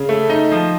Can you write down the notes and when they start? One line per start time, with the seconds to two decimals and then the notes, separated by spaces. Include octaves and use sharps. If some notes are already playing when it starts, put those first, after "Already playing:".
Already playing: C#3
0.09 A3
0.29 D#4
0.52 F3